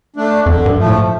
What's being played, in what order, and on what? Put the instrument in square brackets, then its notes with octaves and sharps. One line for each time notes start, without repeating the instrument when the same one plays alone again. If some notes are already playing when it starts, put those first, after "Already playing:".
[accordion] A3 D4
[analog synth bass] F2 [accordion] D3
[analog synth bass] G2
[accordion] F3 A3
[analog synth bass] A2